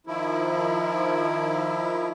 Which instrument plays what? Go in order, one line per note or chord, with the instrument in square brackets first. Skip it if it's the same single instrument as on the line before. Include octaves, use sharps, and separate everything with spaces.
[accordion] D#3 F3 E4